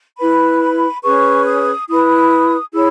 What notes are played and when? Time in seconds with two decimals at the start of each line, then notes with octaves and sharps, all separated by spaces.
0.18 E4 B4 B5
0.61 B5
1.03 C#4 G#4 B4 C#6
1.46 D#6
1.88 E4 B4 D#6
2.73 E4 G#4 C#5 E6